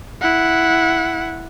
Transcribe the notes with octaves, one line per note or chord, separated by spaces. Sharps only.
E4 F#5